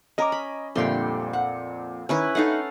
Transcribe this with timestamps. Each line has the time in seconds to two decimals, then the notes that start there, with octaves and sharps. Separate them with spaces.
0.18 C#4 A#4 D#5 A#5 D6
0.32 B5
0.75 F2 A#2 D3 G3 A3 G5 C6
1.33 F#5
2.09 D#3 C#4 E4 B4
2.35 A3 C#4 D#4 A4 F5 F#5